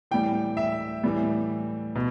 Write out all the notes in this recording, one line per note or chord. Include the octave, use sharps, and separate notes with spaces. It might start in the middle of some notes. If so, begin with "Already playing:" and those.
A2 E3 G3 G5
E5
A2 E3 G3
B2